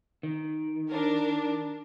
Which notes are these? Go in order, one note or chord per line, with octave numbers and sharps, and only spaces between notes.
D#3
D4 A#4